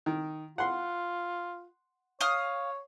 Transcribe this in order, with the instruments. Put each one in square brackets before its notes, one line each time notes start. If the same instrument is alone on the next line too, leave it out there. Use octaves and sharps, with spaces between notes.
[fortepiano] D#3
[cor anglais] F4 [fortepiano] F#5 C6
[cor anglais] C#5 [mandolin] F5 D#6